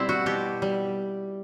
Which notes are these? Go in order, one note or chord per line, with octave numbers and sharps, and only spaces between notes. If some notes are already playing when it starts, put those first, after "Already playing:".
Already playing: B2 G3 C4 E4
F#4
B2 G4
G3